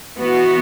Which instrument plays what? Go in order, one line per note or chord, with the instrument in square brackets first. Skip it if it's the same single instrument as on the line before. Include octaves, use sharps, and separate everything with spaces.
[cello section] E3 B3 F#4